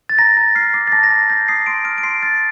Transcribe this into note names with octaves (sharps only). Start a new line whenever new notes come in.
A6
A#5 A#6
A#5 A#6
F6 C7
D6 C7
A6
A5 A#6
A#6
A5 A6
G6 A#6
D#6 C7
C6 D7
F6 D7
D7
C6 C7
F6 A6